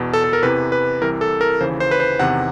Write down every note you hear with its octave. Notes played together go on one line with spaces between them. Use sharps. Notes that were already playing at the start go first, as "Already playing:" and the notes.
Already playing: E2 B2
A4
A4
A#4
E2 C3 E3 B4
B4
C2 C3 E3 A#4
A4
A#4
D#2 C#3 E3 C5
C5
B4
C5
E2 C3 D#3 F#5